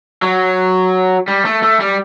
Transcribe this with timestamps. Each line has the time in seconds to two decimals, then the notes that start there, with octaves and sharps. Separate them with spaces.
0.22 F#3
1.28 G3
1.45 A3
1.62 A3
1.80 G3